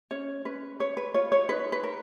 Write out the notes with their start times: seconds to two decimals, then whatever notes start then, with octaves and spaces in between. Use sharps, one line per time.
0.11 C#4 C#5
0.45 C#4 B4
0.80 B4 C#5
0.97 B4
1.14 F4 C#5
1.32 C#5
1.49 D#4 B4
1.72 B4
1.84 A#4